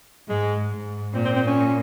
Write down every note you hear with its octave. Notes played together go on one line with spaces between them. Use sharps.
G#2 G#3
G#2
A#2 C4
C4
C4
C#4